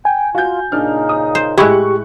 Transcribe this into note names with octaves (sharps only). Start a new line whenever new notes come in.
G5 G#5
F4 F#4 G6
A#2 C#3 D4 D#4 F6
D#6
C5
A2 G#3 E4 G4 C#6 F#6